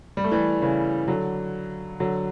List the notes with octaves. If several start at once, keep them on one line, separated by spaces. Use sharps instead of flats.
G3
A3
E3 G3
C#3 E3
D3 F#3
D3 F#3